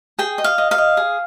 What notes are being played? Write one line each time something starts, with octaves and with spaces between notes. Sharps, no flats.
G#4 G5
D#5
F5
D#5
F5
D#5
G#4